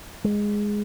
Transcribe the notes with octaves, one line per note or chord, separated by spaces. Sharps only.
G#3